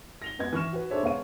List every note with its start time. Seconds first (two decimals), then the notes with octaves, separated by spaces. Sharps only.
0.22 A#6 F7 G7
0.39 F#2 B3 D#5 G#6
0.53 E3 C#6 F6 E7
0.72 F#4 B4
0.91 D4 G#4 A4 C5 C#5 E5
1.03 E1 B3 C#5 F5 C#6 D#7